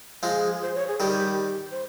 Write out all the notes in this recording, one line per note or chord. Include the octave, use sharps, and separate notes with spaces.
F3 G#3 G#4
C5
C#5
G#4
D#3 G3 G4
C5